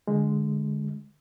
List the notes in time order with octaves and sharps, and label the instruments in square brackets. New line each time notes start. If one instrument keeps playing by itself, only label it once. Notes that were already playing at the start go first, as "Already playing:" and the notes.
[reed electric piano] D3 G#3